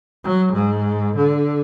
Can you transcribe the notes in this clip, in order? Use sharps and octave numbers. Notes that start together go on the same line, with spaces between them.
F#3
G#2
D3